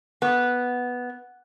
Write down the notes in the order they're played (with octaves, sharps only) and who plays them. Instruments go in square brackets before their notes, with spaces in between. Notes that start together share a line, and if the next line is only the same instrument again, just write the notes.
[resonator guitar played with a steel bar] B3